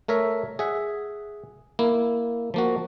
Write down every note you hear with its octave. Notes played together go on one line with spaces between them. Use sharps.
A3 A#4 C#5 E5
G#4 E5 F#5
A#3 E4
F3 A#3 F#4